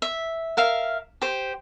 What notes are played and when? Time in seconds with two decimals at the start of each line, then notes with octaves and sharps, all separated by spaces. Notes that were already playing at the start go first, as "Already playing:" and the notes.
0.02 E5
0.57 A#4 E5 F5
1.22 G4 C5